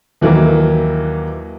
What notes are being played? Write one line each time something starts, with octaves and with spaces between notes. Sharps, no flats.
D#2 E3 F#3 A#3